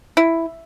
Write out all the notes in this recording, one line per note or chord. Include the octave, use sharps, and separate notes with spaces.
E4